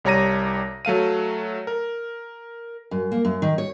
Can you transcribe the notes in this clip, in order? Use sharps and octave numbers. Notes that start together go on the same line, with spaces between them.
C2 G3 C#5 A#5 A#6 D#7
F#3 A3 F5 D#7
A#4
F#2
A#3
F#2
D#3
C#5